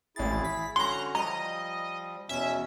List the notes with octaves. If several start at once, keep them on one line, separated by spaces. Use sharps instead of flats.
A1 E4 G#4 A6
B6
D3 C#4 F#4 A#5 C6 F#6
F3 G3 D#5 A#5
E2 B2 C#4 E5